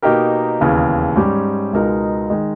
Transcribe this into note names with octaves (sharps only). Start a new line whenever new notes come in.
B2 A#3 D#4 G4 A#4
E1 D#2 C#3 E3
G#2 G3 C#4 G4
C#2 B2 G#3 D#4 A#4
D#3 G#3